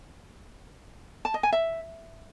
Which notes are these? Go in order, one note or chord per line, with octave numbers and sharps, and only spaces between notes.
A5
D#5
G#5
E5